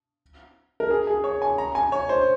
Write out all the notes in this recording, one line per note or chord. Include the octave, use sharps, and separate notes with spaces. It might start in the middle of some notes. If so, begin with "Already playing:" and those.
A#4
G#4
G#4
C#5
G#5
A#5
G#5
C#5
C5